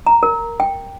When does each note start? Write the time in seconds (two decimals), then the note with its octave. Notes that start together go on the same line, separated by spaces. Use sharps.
0.07 A#5
0.23 A#4
0.60 G5